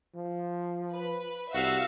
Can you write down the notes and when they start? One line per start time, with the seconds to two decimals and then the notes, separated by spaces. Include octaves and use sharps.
0.15 F3
0.94 B4
1.54 C2 F#4 E5 F5